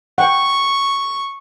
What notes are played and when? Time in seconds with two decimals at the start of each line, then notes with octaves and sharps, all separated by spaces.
0.18 F#5 G5 C#6